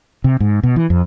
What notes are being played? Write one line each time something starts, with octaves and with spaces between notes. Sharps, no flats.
C3
G#2
B2
E3
F2